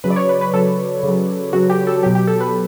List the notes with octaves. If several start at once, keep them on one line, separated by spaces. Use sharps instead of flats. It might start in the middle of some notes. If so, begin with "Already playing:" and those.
C#3 F#3 B4
D5
C#5
B4
B4
C#3 F#3 A4
C#3
F#3
C#3 F#3 F#4
G4
A4
B2 F#3 G4
G4
A4
B4